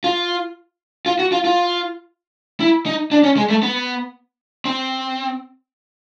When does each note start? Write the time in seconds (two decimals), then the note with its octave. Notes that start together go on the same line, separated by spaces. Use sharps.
0.04 F4
1.06 F4
1.19 F#4
1.32 F4
1.45 F4
2.60 E4
2.86 D#4
3.11 D4
3.24 C#4
3.37 G#3
3.50 A3
3.63 B3
4.65 C4